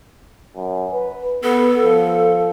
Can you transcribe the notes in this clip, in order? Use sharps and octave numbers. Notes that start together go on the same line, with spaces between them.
F#2
B4
B3 A4
F3